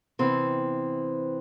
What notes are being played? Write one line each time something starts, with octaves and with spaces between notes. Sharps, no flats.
C3 E3 B3 C4